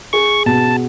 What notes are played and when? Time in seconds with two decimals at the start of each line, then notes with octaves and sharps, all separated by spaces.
0.13 G#4 C#6
0.46 B2 A5